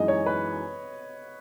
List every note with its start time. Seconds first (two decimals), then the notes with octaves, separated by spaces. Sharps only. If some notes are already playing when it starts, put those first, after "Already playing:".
Already playing: F#2 E3 G#3 D#4 D#5
0.08 C#5
0.26 B4